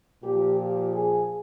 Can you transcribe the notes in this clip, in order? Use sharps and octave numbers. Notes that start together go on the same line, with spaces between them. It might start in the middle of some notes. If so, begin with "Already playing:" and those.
A#2 F3 G4
G4
G#4